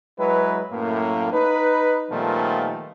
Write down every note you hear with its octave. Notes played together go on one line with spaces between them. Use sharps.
F#3 G#3 E4 B4
F#2 A2 A#3
D#4 B4
A#2 D#3 F3 G3 A3 B3